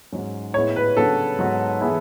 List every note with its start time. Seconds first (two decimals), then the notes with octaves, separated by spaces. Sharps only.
0.12 G#2 F#3 C#4
0.54 A2 G#3 B3 E4 C#5
0.76 B4
0.96 C#3 F#3 B3 D4 F#4 A4
1.38 G#2 F#3 B3 F#4
1.81 E3 B3 E4 G#4